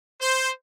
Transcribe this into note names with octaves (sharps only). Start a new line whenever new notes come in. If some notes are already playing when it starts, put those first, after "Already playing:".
C5